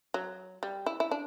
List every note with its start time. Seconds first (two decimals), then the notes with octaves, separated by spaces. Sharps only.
0.14 F#3
0.63 G3
0.86 E4
1.00 E4
1.11 D4